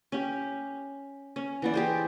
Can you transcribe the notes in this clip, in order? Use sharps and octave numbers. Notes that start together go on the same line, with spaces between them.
C#4 G4
C#4
E3 B3 D5
G4 G#4 C5